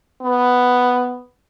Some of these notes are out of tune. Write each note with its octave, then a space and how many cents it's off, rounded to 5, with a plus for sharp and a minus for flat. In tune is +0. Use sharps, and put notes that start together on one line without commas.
B3 +5